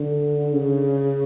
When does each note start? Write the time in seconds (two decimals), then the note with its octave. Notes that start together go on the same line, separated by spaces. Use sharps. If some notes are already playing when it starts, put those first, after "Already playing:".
Already playing: D3
0.55 C#3